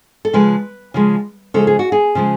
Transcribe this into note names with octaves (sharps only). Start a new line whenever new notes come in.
A4
C#3 F3 G#3 B4
C#3 F3 G#3
C#3 F3 G#3 A4
G#4
F#4
G#4
C#3 F3 G#3